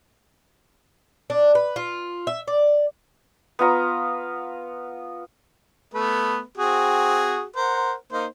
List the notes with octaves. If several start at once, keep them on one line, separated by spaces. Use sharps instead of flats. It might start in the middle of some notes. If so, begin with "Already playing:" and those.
D4
B4
F4
E5
D5
B3 F4 A#5
A3 B3 B4
C4 F#4 G#4
A#4 C5 F#5
A#3 D#4 C5